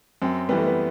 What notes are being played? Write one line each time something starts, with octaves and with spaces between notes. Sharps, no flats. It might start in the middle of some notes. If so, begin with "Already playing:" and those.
F#2 C4
E3 G3 B3
A3
B3